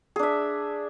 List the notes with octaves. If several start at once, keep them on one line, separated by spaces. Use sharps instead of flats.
D4 G#4 E5